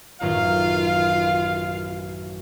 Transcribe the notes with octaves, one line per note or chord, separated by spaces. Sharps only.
A1 F#2 D#3 F4 F5